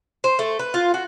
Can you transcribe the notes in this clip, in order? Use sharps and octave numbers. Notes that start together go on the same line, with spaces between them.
C5
A3
B4
F4
F#4